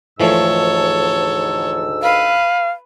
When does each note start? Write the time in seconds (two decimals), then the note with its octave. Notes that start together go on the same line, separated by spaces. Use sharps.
0.20 D2 G#2 E3 F3 A3 A4 C#5 E6
2.03 B4 F5